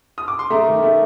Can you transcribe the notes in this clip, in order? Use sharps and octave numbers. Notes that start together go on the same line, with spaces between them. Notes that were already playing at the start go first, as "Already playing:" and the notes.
D#6
D6
C6
A3 A#5
D#3
A3